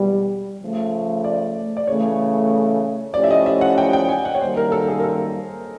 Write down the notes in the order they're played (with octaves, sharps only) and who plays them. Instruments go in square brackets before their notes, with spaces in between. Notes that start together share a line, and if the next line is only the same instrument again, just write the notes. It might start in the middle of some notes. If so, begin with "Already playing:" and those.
Already playing: [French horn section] E2 B2 G3
C#3 F3 A3
[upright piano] D5
D5
[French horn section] C#3 E3 A3 [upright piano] C#5
[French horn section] F3 A3 C#4 E4 G4 [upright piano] D5
[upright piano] E5
D#5
E5
F#5
G5
G5
G#5
F#5
C#5
[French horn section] F#2 D#3 G3 A#3 [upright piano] C5
[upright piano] A#4
A4
G#4
A#4
A4